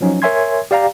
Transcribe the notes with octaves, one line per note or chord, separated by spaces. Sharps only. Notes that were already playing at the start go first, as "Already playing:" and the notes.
F3 F#3 C#4 D#4
A#4 C#5 E5 G#5 C6 G#6
G4 D5 F5 G5 A#5